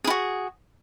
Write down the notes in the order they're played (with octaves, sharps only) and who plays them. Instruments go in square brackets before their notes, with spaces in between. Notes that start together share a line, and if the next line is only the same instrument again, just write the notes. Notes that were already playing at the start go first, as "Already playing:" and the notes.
[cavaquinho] G#4
E4
F#4